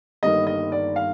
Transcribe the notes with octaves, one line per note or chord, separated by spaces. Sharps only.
G1 G2 D#3 A#3 D#5
D#5
D5
F5